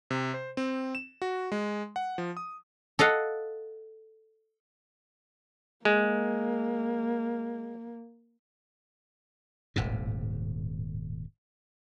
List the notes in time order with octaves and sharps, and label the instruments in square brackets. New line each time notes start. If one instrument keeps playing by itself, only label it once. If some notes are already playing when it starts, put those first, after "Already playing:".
[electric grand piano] C3
C5
C4
E7
F#4
G#3
F#5
F3
D#6
[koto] A4 D#5 F5 F#5
[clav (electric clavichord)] G#3 [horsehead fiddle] A#3
[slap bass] D#1 G#1 A2 C3